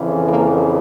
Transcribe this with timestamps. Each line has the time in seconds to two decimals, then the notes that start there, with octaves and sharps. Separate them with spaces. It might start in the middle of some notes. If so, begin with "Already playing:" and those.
Already playing: F2 C#3 E3
0.26 A#3